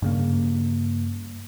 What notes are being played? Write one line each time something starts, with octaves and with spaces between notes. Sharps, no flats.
G2 C#3 A#3